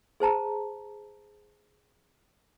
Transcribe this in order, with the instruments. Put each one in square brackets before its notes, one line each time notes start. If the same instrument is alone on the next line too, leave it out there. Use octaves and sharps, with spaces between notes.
[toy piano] G#4 C5 A5 A#5